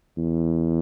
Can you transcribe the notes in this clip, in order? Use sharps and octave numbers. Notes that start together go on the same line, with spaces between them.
E2